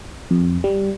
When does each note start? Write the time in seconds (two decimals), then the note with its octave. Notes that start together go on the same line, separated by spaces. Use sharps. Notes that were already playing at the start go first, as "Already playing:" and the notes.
0.31 F2
0.64 G3